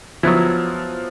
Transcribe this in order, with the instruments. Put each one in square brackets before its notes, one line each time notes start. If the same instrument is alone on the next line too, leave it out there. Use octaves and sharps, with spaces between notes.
[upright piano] F3 [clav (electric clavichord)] F#3 B3 E4